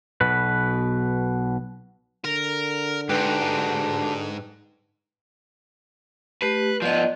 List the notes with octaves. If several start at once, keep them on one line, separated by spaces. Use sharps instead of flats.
B1 B2 B4
D3 A#4
G#2 D4 F#4 G4 B4 G5 F#6
A3 G4 B4
F3 B3 D5 D#5